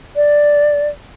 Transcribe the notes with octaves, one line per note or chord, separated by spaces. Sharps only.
D5